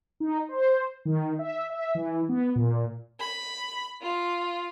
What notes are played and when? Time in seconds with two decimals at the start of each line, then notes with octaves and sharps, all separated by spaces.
0.20 D#4
0.49 C5
1.05 D#3
1.39 E5
1.70 E5
1.95 E3
2.29 B3
2.55 A#2
3.20 B5
4.02 F4